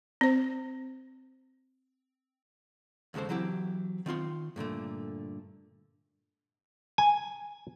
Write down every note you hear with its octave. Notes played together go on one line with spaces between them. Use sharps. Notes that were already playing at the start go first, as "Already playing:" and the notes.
C4 C5
D#2 C#3 G#3 A4 C5
E3 F#3 C4 E4 G4
D#3 C4 F4 C6
G2 A#2 D3 A3
G#5